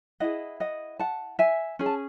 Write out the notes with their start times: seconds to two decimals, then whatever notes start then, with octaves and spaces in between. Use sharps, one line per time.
0.20 E4 G#4 D#5 F#5
0.60 D#5 F#5
0.99 F#5 A5
1.39 E5 G#5
1.79 C#4 G#4
1.86 A5